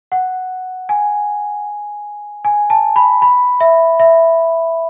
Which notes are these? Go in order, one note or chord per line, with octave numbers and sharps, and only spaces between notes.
F#5
G#5
G#5
A5
B5
B5
E5
E5